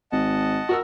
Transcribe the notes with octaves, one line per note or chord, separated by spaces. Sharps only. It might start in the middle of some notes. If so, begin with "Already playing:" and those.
G#1 D#5 F#5 A5
F#4 A#4 E6